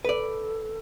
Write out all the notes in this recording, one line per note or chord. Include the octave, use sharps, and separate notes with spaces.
A4 B4 D5